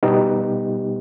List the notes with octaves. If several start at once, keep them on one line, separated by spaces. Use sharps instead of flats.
B2 G3 B3 D#4 G4